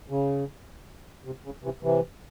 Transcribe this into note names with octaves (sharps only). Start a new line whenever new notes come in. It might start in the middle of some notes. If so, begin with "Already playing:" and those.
C#3
C3
C#3
C3 E3
C3 E3